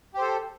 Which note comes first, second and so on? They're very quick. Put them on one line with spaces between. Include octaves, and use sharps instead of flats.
G4 C5 A4